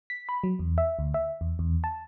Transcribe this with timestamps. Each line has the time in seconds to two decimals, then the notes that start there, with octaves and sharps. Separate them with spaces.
0.10 B6
0.29 B5
0.44 F#3
0.59 E2
0.78 E5
0.99 D2
1.14 E5
1.41 E2
1.59 E2
1.84 A5